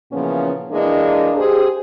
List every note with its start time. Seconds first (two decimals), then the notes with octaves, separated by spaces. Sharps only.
0.12 A#2 C#3 E3 F3 B3 C#4
0.71 E3 G#3 A#3 D4
1.37 G4 G#4 C5